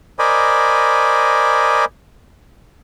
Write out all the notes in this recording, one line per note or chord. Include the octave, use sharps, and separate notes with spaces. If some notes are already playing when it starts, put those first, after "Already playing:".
A#4 C5 D5 D#5 G#5 B5